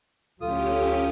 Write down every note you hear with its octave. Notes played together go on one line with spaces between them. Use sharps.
D2 F#3 C#4 F4 G4 A4 D#6